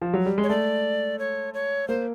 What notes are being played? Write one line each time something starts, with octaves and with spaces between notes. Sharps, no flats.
F3
F#3
G3
G#3
C#5
A3 D5
C#5
C#5
A#3 C5